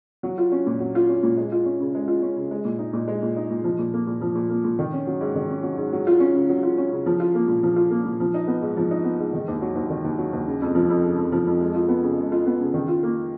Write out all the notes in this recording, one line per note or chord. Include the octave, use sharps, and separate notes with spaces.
F#3
F4
C#4
A#2
F#3
F4
C#4
A#2
G#3
F4
C#4
C#3
G#3
F4
C#4
C#3
G#3
A#2
D#4
A#2
G#3
A#2
D#4
A#2
F3
A#2
A#3
A#2
F3
A#2
A#3
A#2
D#3
C#4
F#3
G#2
D#3
C#4
F#3
G#2
F#3
F4
C#4
C#3
F#3
F4
C#4
C#3
F3
F4
A#3
A#2
F3
F4
A#3
A#2
F3
D#4
B3
G#2
F3
D#4
B3
G#2
D#3
D#2
F#3
D#2
D#3
D#2
F#3
D#2
C#3
F2
F3
F2
C#3
F2
F3
F2
G#3
F4
B3
C#3
G#3
F4
B3
C#3
D#3
F4
A#3